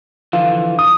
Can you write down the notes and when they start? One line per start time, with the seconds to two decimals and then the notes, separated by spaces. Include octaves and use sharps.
0.33 D3 E3 F3 F5
0.79 D#6